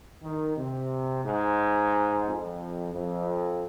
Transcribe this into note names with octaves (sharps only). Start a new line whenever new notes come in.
D#3
C3
G#2
F2
F2